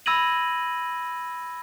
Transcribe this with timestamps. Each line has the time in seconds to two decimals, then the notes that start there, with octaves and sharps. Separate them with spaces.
0.06 B5 E6 G#6 A#6 D#7 F#7